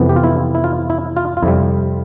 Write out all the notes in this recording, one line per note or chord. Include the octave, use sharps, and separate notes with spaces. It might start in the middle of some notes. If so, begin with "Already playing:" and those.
Already playing: F2 C3 E3 B3
G4
F4
E4
E4
F4
E4
F4
F4
F2 C3 G3 E4